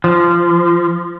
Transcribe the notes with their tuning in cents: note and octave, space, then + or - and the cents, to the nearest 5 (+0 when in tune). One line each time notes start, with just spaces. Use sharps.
F3 -20